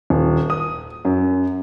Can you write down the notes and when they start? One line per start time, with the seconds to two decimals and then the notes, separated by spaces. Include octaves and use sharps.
0.10 D#1
0.50 D#6
1.05 F#2